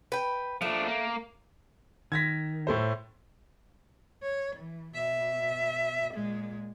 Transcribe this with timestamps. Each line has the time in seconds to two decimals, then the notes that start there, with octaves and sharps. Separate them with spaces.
0.12 B4 G5
0.62 F3 A3 D4
0.86 A#3
2.12 D#3 G#6 A#6 B6
2.67 A2 A3 C5
4.23 C#5
4.56 E3
4.95 B2 E5
6.14 A#2 G#3